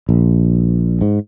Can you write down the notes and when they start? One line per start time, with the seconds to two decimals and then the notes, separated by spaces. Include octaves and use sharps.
0.09 A#1
1.01 G#2